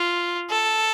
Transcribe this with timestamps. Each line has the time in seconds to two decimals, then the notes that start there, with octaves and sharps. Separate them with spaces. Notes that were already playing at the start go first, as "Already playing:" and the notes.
Already playing: F4
0.50 A4